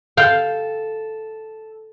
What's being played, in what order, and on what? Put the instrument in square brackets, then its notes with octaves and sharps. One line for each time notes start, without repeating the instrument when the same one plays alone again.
[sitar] A4 [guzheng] F5 G5